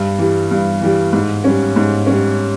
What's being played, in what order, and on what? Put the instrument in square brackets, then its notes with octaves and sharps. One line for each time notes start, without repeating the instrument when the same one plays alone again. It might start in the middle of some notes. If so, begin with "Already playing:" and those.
Already playing: [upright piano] G2
E3 G3
G2
E3 G3
G#2
G3 C#4
G#2
G3 C#4